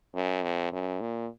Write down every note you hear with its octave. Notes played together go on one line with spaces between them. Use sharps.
F#2
F2
F#2
A#2